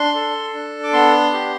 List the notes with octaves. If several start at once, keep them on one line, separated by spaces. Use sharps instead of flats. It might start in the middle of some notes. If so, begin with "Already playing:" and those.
Already playing: D4 C6
A4
D4
D6
B3 C6
G4